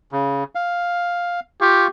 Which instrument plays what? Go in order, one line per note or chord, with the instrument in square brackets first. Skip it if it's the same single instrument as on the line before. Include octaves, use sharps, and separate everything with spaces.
[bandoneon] C#3
F5
[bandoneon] F4 F5 C#6 [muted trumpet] G4